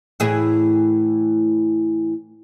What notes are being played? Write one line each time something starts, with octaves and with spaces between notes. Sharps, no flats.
A2 E3 G#4